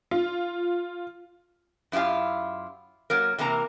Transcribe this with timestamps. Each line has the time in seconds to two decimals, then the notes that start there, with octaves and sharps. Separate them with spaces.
0.11 F4
1.92 F#2 E4 F4 G4 F5
3.10 F#3 A#3 A#4
3.38 C3 E3 A#3 A#4 A#5